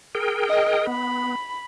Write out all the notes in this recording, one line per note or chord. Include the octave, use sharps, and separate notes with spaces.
G#4 A#4 G5
D#5
B3 B5